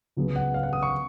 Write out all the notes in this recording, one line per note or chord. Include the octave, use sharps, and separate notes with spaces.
C#2 C#3 F#3 B3
F#5
F5
F#5
D#6
C#6